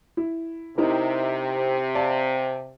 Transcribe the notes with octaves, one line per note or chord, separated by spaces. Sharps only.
E4
C3 D#4 E4 A#4
D5 F5 A5